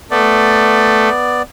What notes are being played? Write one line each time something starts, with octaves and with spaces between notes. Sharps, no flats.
A3 B3 D5